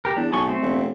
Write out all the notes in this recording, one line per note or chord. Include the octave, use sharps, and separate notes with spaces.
G4 A#4
E2 D4
B1 G#4 A4 C#6
A3 C4
E1